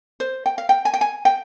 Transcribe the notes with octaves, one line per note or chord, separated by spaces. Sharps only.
C5
G5
F5
G5
G#5
G5
G#5
G5